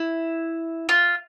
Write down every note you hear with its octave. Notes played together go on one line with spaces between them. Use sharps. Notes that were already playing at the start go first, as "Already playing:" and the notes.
Already playing: E4
F4